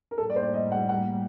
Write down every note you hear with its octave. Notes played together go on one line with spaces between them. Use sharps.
A#4
A2 G3 A#3 A4
D5
C5
D5
D#5
F#5
F#5